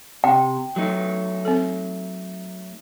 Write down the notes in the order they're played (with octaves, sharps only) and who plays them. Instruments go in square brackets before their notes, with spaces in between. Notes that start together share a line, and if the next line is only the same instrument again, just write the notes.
[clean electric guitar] C3 [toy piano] G5
[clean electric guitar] F#3 A3 D#4
[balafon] C4 A4